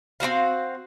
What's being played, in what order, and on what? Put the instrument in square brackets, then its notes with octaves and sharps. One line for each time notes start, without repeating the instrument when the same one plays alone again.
[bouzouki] C4 D#4 F#4 F5